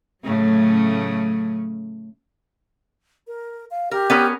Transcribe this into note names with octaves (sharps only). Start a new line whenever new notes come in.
A2 C#3 F#3 A3 C#4
A#4
F5
G4 A#4
B3 C#4 A#4